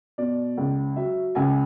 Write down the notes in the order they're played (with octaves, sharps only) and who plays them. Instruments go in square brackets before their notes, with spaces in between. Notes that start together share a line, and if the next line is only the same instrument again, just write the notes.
[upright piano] B2 D5
C#2
F#3 E5
C#2 G#5